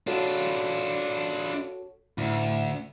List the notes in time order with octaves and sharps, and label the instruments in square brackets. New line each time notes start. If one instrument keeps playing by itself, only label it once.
[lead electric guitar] D4 F4 [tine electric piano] F#4 A4 C#5
[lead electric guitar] D2 [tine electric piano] A2